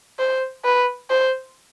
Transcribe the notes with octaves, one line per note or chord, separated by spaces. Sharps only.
C5
B4
C5